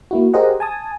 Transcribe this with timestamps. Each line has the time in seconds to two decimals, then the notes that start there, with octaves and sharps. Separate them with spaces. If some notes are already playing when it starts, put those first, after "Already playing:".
0.11 A#3 E4 F#4
0.34 G4 G#4 A#4 C5 D#5 F#5
0.60 G#5 A5 D#6